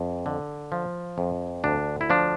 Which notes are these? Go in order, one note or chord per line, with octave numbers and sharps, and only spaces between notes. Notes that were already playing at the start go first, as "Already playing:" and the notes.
Already playing: F2
D3
F3
F2
D2 D4
E4
F3 D4